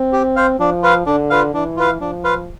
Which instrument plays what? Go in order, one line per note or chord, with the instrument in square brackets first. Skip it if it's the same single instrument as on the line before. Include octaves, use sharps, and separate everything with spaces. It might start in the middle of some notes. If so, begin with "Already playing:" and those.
Already playing: [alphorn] C4
[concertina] G4
C5 F5
[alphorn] F3 [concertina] D4
[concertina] F4 B4 F5
[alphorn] D3 [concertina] D4
[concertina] F4 B4 F5
[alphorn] E3 [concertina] D4
[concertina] F4 B4 F5
[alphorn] F3 [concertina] D4
[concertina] F4 B4 F5